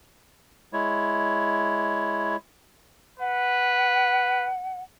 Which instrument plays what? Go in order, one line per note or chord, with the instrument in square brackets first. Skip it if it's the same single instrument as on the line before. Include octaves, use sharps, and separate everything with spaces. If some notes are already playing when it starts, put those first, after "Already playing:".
[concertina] G#3 E4 C#5
[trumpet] B4 [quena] F#5